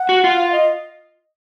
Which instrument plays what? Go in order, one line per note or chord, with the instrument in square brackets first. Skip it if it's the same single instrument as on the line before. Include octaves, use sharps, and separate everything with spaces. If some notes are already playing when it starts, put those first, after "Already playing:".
Already playing: [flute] F#5
[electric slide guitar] F#4
F4
[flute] F5
D#5